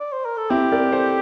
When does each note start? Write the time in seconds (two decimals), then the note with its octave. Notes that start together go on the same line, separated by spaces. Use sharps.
0.00 D5
0.13 C5
0.25 A#4
0.37 A4
0.50 C4 E4 G4
0.72 A#4 D5
0.92 A4 C5